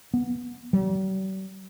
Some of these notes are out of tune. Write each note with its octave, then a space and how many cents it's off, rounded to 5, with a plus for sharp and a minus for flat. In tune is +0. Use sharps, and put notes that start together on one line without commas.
B3 -15
G3 -45